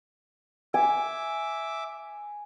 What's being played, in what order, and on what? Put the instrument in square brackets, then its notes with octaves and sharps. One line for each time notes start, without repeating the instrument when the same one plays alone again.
[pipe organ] E5 D6 [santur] G#5